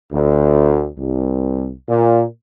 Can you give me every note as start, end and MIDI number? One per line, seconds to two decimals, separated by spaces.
0.12 0.86 38
0.98 1.71 36
1.88 2.24 46